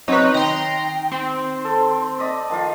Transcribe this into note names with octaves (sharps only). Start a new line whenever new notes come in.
F#3 C4 D#4 B4 C#5 D#5
D#3 G5 A#5 C6
C4 C6
A4
D5 D#5 B5
D#3 F3 F4